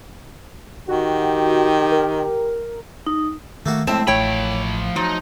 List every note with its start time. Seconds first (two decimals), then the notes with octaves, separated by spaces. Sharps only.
0.88 D#3 F#4 G4
1.92 A#4
3.07 D#4
3.66 D#3 A3 A#3 F#4
3.87 F2 A2 G#3 A#3 C4 E5 A5
4.07 A1 F3 C#5 G5 B5
4.96 F3 F#3 D#4